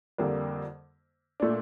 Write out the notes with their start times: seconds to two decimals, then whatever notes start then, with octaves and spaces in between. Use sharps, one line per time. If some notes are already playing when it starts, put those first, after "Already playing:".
0.18 F2 D3 G3 A#3
1.40 A#2 A3 D4